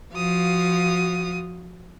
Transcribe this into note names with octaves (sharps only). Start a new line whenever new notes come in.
F3 F#4 F5 D#6